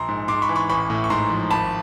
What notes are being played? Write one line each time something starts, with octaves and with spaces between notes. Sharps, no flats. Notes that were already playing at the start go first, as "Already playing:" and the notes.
Already playing: A#1 A#5 C6
G#2
G#2 C6 D6
B5 C#6
E3
B5 C#6
A1 B5 C#6
A2
C#6
G#2 A#5 C6
F3
G#1 A5 B5